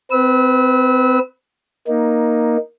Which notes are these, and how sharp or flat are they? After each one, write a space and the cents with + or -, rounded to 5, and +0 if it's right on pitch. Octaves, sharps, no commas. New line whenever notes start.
C4 -30 B4 +0 E6 -35
A#3 +10 D#4 +0